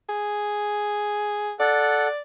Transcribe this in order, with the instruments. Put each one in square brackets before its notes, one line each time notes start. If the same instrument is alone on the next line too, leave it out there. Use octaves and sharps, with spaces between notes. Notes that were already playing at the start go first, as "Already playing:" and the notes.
[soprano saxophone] G#4
[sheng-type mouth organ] A4 F#5 [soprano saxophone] D5